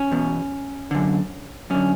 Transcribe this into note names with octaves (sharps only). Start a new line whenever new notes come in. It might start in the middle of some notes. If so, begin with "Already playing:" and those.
Already playing: C#4
E2 B2
F#2 D3
F#2 D3 C#4